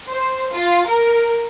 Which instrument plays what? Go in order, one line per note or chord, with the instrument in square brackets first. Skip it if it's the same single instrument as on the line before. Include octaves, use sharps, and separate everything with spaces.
[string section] C5
F4
A#4